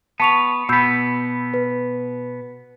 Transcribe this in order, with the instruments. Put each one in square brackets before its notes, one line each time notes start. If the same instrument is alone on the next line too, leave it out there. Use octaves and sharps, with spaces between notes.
[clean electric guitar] B3 [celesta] A5 C#6 F7
[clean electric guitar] B2 B3 [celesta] B5 E6 G6
[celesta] B4